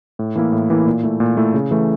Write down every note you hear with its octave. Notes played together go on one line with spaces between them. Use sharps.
A2
E3 A#3 E4
A2
E3 A#3 E4
A#2
A3 E4
A#2
A3 E4
C#3
E3 A3